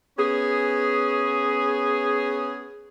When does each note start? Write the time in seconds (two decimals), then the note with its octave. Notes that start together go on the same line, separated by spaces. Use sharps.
0.18 B3 C#4 G#4